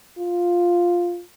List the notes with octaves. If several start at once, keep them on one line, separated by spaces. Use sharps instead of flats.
F4